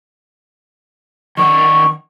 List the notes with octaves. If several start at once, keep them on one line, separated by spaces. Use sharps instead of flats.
D#3 D5 F#5 C#6